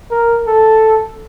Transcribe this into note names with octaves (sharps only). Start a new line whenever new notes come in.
A#4
A4